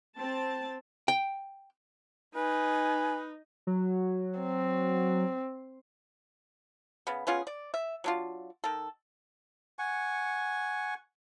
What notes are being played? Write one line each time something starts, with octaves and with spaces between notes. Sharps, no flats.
C4 A5
G5
D#4 B4 G#5
F#3
C4
C#3 B3
B3 C#4 F4 G#4
D5
E5
F#3 D4 F4
D#3 A4
F#5 G#5 C#6